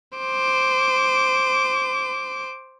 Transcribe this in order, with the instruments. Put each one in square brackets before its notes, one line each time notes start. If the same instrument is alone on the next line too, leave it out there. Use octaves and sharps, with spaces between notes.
[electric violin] C5 D6